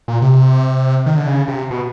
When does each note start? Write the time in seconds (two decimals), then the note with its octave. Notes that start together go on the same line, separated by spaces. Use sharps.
0.08 A#2
0.22 C3
1.06 D#3
1.17 D3
1.27 C#3
1.48 C3
1.71 B2